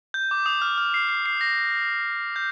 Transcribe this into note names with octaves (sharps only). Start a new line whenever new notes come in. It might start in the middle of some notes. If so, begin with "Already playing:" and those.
G6
D6
D#6
F6
F6
C7
C7
C7
A#6
G6